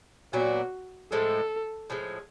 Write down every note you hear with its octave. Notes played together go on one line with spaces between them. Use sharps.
A#2 F#3 B3 D4 F#4
A2 F3 G#3 A4
A2 F3 G#3